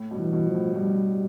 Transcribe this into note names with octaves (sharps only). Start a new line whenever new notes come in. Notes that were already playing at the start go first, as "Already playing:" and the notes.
Already playing: A2
G2 B2
E3
G2 B2
F3
A2
G2 G3